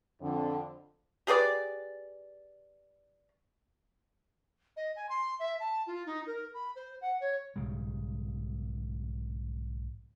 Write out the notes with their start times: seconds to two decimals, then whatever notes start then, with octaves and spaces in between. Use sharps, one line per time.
0.21 F2 D3
1.27 G4 G#4 B4 D5
4.76 D#5
4.96 G#5
5.09 C6
5.39 E5
5.60 A5
5.87 F4
6.06 D#4
6.27 A#4
6.54 B5
6.76 C5
7.01 F#5
7.20 C#5
7.56 B1 G#2 C#3 G3